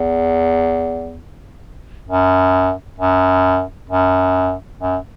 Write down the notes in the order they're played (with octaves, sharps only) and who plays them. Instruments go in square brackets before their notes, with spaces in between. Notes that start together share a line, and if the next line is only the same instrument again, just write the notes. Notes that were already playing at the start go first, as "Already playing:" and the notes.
Already playing: [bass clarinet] E2
F#2
F#2
F#2
F#2